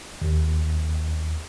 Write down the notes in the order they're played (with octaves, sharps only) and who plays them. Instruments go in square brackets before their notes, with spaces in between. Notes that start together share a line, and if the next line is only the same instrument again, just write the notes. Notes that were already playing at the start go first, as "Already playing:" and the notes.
[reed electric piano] D#2